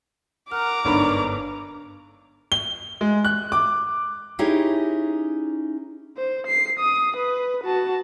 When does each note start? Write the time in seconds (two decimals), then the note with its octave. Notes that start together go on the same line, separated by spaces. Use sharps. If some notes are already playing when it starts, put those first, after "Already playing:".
0.52 A#4 F#5 A#5 D6 F6
0.85 G1 G#2 D4 A#4 C#5 D5 B5
2.52 G7
3.01 G#3
3.25 F#6
3.52 D6
4.39 C#4 D#4 E4 G4 G#4 C#5
6.17 C5
6.47 C7
6.79 D#6
7.17 B4
7.64 F#4 A5